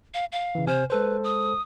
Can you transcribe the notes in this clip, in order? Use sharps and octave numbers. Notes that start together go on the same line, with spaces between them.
F5
F5
C#3 E3
C3 C5 G#5 F6
G#3 A4 B4 C5
D#6